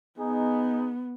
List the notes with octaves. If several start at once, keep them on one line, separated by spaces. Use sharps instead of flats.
B3 D#4 G#4